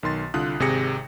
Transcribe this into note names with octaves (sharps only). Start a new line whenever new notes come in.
B1 D#3 C6 A6
C2 D3 F4 D#6 F#6
G#1 C3 G#4 A#6 C#7